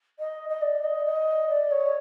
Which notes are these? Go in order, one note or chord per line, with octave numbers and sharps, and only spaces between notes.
D#5
D#5
D5
D#5
D#5
D5
C#5